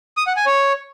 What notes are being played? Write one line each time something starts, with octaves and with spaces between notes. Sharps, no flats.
D#6
F#5
G#5
C#5